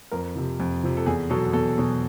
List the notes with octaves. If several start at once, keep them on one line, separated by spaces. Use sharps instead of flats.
F2 A#4
C3 F3
F2
C3 F3
A4
E2 G#4
B2 F#3 A4
E2 A4
B2 F#3